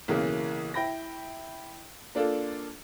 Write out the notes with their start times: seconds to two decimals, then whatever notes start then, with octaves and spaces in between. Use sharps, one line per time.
0.08 B1 C#3 E3 A#3 A#4
0.74 E4 G5 B5 A#6
2.15 A#3 D4 F4 A4